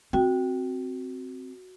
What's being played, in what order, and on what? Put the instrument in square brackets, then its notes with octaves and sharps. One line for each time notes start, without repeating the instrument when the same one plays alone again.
[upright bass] C4 [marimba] F#4 G5